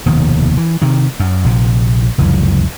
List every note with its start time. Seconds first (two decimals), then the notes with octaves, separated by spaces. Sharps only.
0.06 F1 D#2 B2 D#3
0.57 E3
0.82 C3 D#3
1.20 F#2
1.45 A#1 C3
2.18 F1 C#2 F#2 E3